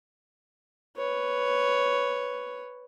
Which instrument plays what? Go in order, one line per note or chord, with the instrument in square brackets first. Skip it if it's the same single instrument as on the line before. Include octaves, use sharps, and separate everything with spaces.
[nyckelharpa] B4 C#5